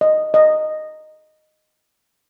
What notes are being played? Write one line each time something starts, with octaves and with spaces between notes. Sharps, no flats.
D#5
D#5